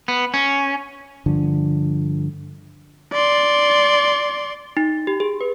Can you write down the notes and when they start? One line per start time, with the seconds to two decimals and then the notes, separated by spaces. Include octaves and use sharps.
0.08 B3
0.34 C#4
1.26 G2 D3 F3
3.12 D5 C6
4.77 D#4
5.07 G4
5.20 G#4
5.41 B4